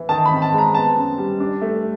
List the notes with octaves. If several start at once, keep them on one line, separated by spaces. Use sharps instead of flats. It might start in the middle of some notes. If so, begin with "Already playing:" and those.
Already playing: E3
D#3 A5
B5
C4
A5
G#3
A#5
B3 A5
F#2
G3
D4
A3